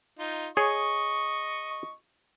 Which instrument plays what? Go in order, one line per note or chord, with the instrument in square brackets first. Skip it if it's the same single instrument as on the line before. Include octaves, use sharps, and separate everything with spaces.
[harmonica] D#4 F4
[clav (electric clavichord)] G#4 C#5 [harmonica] D#5 C#6